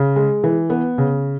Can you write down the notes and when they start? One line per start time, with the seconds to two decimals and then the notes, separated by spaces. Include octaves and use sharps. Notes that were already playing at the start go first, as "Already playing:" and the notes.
Already playing: C#3
0.16 G#3
0.44 E3
0.70 B3
0.98 C#3